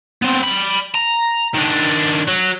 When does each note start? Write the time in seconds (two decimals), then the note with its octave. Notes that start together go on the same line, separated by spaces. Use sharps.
0.22 B3 C4
0.44 D5 B5
0.95 A#5
1.54 D#3 D4
2.28 F#3